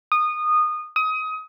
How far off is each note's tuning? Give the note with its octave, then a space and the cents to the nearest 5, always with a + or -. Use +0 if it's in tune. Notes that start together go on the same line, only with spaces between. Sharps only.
D#6 -20
D#6 +25